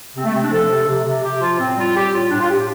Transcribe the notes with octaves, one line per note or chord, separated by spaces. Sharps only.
C3 C4
A3
C3 C4
D4
F3 A4
C3
C3
C3
C3 G4
F3 F4
A2 C4
G3 F4
G3 G4
A2 F4
A2 D4
F4
A2 G4
G4